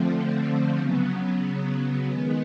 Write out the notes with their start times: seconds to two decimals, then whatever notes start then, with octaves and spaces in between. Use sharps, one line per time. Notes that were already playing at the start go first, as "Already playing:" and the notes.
Already playing: D3 F3 A3 C4
0.78 C#3 F#3 B3
2.07 D#3 G#3 B3